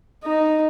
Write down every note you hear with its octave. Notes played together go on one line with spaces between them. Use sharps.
D#4